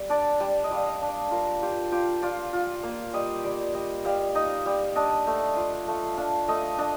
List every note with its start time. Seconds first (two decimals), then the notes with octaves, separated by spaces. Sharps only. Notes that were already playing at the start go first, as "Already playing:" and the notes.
Already playing: G3
0.09 D4 D5
0.40 G3
0.64 D#5
0.71 G3 F5
0.87 D#5
1.02 D4
1.09 D5
1.31 F4 A#4
1.63 F4 G4
1.92 F4 G4
2.23 F4 D5
2.53 F4
2.83 A#3
3.13 G3 D#5
3.44 G3 D5
3.74 G3 D#5
4.05 G3 F5
4.35 D#4 D#5
4.66 G3
4.96 D4 D#5
5.27 A3
5.56 F4
5.87 A3 F5
6.17 D4 F5
6.48 A3 D#5
6.78 D4 D#5